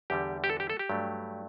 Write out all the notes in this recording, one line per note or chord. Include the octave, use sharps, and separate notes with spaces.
E2 D3 G3 G4
G4
A4
G4
A4
G4
G2 F#3 A3